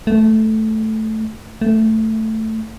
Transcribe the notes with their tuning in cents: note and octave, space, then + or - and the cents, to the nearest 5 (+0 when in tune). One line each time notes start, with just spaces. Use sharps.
A3 -5
A3 +5